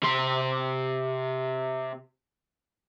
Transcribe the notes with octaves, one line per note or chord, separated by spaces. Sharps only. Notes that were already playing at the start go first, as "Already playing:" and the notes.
C3 C6